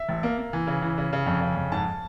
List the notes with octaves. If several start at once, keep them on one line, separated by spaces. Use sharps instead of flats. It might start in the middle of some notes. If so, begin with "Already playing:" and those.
Already playing: E5
A1
A#3
A#3
E3
C#3
E3
C#3
C#3
F2
C#3
F2
G#2 A5